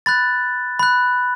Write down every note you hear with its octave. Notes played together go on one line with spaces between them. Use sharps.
B5 F#6 A6
B5 F#6